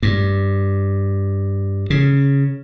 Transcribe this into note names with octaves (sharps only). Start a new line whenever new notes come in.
G2
C#3